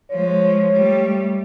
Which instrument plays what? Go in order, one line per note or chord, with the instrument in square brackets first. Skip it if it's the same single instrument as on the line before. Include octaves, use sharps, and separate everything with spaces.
[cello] F3 G#3 [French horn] C#5
[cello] G3 A3